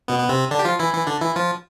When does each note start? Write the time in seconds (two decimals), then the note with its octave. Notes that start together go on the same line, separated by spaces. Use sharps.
0.08 B2 B3
0.19 B3
0.29 C3 C4
0.51 D3 D4
0.59 G4
0.65 F3 F4
0.79 E3 E4
0.93 E3 E4
1.07 D3 D4
1.21 E3 E4
1.36 F3 F4